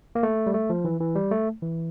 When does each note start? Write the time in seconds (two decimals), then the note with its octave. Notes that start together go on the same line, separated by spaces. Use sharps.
0.15 A#3
0.23 A3
0.47 G3
0.54 A3
0.70 F3
0.85 E3
1.00 E3
1.16 G3
1.31 A3
1.62 E3